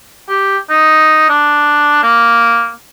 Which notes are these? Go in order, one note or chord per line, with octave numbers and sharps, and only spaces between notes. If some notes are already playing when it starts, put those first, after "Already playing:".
G4
D#4
D4
A#3